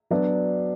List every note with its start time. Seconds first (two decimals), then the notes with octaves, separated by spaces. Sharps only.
0.11 F#3 B3 D4 F#4